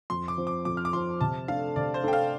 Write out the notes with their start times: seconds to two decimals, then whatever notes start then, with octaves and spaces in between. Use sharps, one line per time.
0.10 F2 C6
0.28 D6
0.37 F3 C4
0.47 D6
0.65 F2 D6
0.77 F6
0.85 D6
0.93 F3 C4 C6
1.21 C3 A5
1.48 A3 D4 A4 F5
1.76 C3 D5
1.94 C5
2.04 A3 D4 A4 G5
2.13 F5